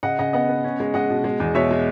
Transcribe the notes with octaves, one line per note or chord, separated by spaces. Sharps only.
C#3 D#5 F#5
C#3 D#5 F#5
B3 D#5 F#5
B3
C#4
G#3
G#3 D#5 F#5
B2
G#3
E2
B2 C#5 E5
G#3